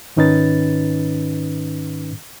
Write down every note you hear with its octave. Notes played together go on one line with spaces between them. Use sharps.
G#2 D#3 C#4 D#4 B4 A6